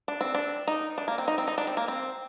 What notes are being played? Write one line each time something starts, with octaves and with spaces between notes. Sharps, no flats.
D4
C4
D4
D#4
D4
A#3
C4
D#4
C4
D#4
D4
C4
A#3
C4